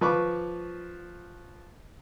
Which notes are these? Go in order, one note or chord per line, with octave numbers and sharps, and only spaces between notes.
F3 B4 C#6 D6